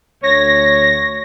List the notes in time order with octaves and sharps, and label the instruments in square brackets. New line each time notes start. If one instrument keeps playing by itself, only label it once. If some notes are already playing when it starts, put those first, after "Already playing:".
[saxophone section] D2 C#5 [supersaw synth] A#6